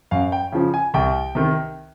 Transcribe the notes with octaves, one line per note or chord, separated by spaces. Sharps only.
F#2 F5
G5
C#3 F3
G#5
C2 G5
C3 D#3